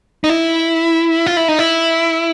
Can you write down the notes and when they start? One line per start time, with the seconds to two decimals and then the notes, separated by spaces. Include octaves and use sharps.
0.24 D#4
0.30 E4
1.26 F4
1.37 E4
1.48 D#4
1.59 E4